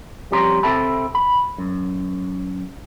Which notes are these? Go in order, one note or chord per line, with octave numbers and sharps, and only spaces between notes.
F2 G3 G4 C#5 A#5 C6
C3 C4 A4 E5 A5 B5
B5
F#2